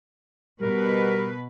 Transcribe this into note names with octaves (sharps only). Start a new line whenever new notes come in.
B2 G3 A#4 B4